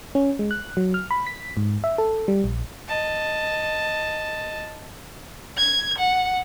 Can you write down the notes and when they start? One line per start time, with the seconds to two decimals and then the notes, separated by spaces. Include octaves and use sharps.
0.15 C#4
0.39 G#3
0.51 F#6
0.77 F#3
0.94 F6
1.11 B5
1.27 B6
1.57 G#2
1.84 E5
1.98 A4
2.28 G3
2.44 A#1
2.88 D#5 A5
5.57 G#6
5.98 F#5